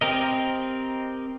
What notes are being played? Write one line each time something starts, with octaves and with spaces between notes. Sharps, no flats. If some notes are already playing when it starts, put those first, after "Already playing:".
C4 G4 A#4 D#5